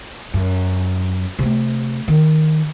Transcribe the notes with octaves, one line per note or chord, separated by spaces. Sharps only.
F#2
C3 A3
D#3